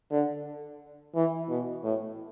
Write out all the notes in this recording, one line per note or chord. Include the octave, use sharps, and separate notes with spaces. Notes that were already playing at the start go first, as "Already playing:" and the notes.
D3
E3
B2
A2